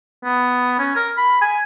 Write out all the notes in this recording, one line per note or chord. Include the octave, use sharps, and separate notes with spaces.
B3
C#4
A#4
B5
G#5